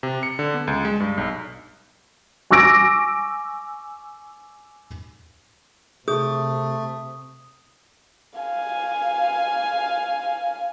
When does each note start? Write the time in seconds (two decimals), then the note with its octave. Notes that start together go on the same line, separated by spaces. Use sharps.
0.03 C3
0.23 C#7
0.39 D3
0.54 B3
0.67 C#2
0.85 G#3
1.00 G2
1.18 B1
2.51 G#5 C#6 D6 E6 A#6 D7
6.08 C3 A3 G#4 D#6
8.39 F5 G#5